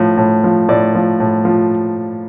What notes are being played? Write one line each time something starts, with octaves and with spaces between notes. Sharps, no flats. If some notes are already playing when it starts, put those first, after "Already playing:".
Already playing: A2 F3
A2
F3
A2 D5
F3
A2
F3